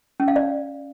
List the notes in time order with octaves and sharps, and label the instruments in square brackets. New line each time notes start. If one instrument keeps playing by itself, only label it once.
[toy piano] C#4
F5
D5